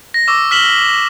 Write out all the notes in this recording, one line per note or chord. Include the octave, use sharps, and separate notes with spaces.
A#6
C#6 D6 E6
F6 B6 E7 F#7 G7